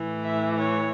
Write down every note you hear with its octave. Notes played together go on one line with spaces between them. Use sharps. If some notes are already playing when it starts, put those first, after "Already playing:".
Already playing: A2 E3
E5
C#5